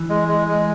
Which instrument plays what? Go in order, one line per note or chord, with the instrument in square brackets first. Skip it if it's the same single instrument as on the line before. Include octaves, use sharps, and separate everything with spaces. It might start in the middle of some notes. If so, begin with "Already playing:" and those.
Already playing: [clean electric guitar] E3
[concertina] G#3
G#3
G#3